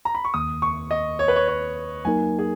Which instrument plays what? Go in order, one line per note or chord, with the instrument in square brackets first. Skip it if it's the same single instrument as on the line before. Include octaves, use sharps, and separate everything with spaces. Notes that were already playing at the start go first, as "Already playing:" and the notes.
[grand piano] A#5
B5
C#6
[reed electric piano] D#2 D#3 A#3 [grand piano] D#6
[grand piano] C#6
D#5
C#5
B4
C#5
C#5
[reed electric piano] F#3 A#3 D#4 A#4 [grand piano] G#5
[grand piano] G#4